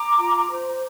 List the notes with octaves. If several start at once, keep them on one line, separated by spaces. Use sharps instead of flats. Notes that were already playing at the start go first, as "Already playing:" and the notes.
Already playing: A#5 D6
F4
C5